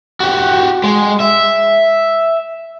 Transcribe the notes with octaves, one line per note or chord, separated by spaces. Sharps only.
F#4 G4
G#3
E5